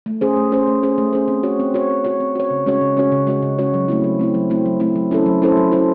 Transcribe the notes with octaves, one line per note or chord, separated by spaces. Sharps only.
A3
C#4 G#4 C5
A3
C#4 G#4 C5
A3
C#4 G#4 C5
A3
C#4 G#4 C5
C4
F#4 C#5
C4
F#4 C#5
C4
F#4 C#5
C4
F#4 C#5
C#3
G#3 C#4 F#4 C#5
C#3
G#3 C#4 F#4 C#5
C#3
G#3 C#4 F#4 C#5
C#3
G#3 C#4 F#4 C#5
F#3
A3 C4 E4
F#3
A3 C4 E4
F#3
A3 C4 E4
F#3
A3 C4 E4
F#3
C#4 E4 A4 C5
F#3
C#4 E4 A4 C5
F#3
C#4 E4 A4 C5